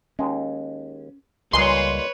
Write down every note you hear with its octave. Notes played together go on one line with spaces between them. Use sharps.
D#2 G#3 C#4
C#2 A#2 G3 G#3 B4 C#5 C6